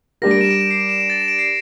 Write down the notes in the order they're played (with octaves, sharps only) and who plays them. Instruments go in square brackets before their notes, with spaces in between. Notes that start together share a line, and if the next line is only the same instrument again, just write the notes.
[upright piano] G3 D4 G4 A#4 [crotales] A#6
[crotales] D7
E7
D7
D7
C7
D7
E7
D7
A6
E7
D7
C7